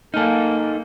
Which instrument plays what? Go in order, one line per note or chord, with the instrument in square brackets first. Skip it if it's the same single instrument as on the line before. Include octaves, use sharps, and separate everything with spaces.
[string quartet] A#3 [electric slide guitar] D#4 A4 [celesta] F5 G#5 F6